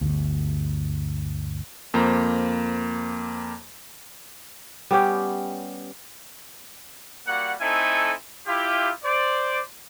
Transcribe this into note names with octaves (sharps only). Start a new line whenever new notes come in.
G1 D2
F2 A#3 C5 A#5
G3 B3 C#4 G4
G3 A#3 F#4 F#5
A3 C4 D#4 E4 A4 G#5
E4 F4 G4
C5 D5